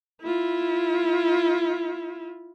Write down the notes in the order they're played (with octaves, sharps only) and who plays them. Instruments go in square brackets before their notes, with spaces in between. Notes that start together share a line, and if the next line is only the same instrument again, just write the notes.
[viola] E4 F4